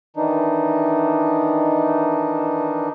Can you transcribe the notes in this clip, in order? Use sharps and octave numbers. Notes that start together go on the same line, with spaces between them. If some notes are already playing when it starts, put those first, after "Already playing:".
D#3 E3 D4 D#4